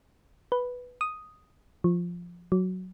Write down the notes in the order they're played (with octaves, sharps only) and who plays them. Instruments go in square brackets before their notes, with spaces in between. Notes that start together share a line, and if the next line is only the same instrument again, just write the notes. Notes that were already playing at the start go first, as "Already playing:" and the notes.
[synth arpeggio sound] B4
D#6
F3
F#3